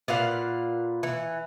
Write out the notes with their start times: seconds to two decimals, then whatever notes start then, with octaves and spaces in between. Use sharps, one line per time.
0.08 A#2 B4 F5 F#5
1.03 E3